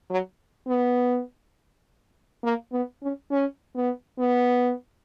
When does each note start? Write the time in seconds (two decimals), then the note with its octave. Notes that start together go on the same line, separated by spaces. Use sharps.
0.10 F#3
0.68 B3
2.44 A#3
2.72 B3
3.03 C#4
3.31 C#4
3.76 B3
4.19 B3